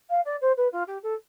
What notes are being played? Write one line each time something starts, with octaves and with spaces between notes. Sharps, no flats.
F5
D5
C5
B4
F4
G4
A4